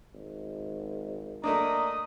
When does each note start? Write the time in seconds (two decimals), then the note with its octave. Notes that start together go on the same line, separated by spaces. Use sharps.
0.13 G#1
1.44 A3 A#3 D4 D#5 A#5 D#6